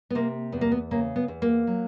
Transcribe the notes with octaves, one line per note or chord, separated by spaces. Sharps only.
B3
C3 A#3
E2 B3
A#3
B3
C#3 A#3
B3
E2
A#3
F#3